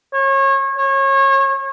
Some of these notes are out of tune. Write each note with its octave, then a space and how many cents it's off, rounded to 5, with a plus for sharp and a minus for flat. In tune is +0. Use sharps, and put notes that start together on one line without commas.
C#5 -30
C#5 -30